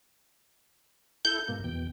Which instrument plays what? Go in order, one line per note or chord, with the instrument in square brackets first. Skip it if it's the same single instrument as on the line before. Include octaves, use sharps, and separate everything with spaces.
[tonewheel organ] E4 A4 [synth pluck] G6
[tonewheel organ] G#2 B2 A#3
E2 B2 G5